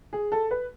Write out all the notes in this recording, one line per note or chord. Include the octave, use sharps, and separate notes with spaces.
G#4
A4
B4